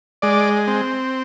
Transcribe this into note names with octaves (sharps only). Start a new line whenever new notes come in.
G#3 D5
C4